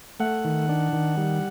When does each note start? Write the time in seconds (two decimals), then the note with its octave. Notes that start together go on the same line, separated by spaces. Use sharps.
0.20 A3 F#5
0.45 D#3
0.69 D4
0.93 D#3
1.17 G3